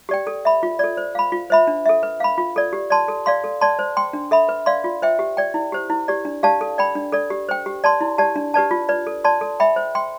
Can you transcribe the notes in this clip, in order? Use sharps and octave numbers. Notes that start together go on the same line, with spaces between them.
G4 D5 G5
A4
E5 B5
F4
A4 D5
C5
F5 B5
F4
C5 E5 B5
D4
A4 E5
B4
F5 B5
F4
A4 D5
G4
D5 A5 C6
A4
D5 F5 C6
A4
D5 A5 C6
C5
G5 C6
D4
A4 E5 B5
B4
D5 F5 C6
F4
C5 E5 G5
G4
D5 G5
E4
G4 C5
E4
G4 D5
D4
G4 D5 F5 A5
A4
D5 G5 B5
D4
A4 D5
G4
C5 G5
G4
D5 A5 C6
E4
G4 D5 A5
D4
G4 B4 D5 A5
F4
B4 D5
A4
D5 A5 C6
A4
E5 G5 B5
C5
G5 C6